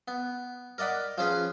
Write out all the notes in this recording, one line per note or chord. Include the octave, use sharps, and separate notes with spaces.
B3
A#4 D5 D#5 F#5 B5
F3 C#4 G#4 B4